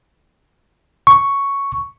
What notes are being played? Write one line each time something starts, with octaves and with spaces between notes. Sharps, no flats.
C#6